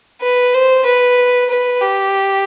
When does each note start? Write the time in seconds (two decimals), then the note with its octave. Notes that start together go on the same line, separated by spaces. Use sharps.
0.22 B4
0.54 C5
0.85 B4
1.49 B4
1.81 G4